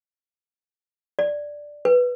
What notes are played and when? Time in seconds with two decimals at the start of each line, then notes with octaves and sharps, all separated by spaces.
1.19 D5
1.85 B4